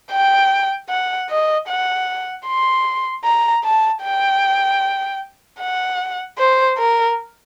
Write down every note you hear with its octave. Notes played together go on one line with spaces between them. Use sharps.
G5
F#5
D#5
F#5
C6
A#5
A5
G5
F#5
C5
A#4